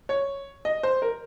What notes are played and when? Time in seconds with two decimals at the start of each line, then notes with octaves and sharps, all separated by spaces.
0.09 C#5
0.65 D#5
0.83 C5
1.02 A#4